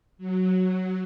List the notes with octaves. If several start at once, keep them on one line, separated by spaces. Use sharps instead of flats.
F#3